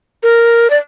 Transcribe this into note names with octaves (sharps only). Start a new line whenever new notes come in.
A#4
D5